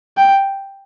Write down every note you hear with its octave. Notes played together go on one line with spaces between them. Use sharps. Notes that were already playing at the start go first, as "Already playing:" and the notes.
G5